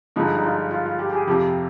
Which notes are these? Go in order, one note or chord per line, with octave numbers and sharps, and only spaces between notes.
G2 D3 F3 G#3 D#4
D#4
F4
F4
F4
G4
G4
G#4
F2 C3 F3 C4 G4